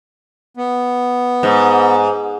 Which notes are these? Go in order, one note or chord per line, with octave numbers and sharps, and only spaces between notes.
B3
G#2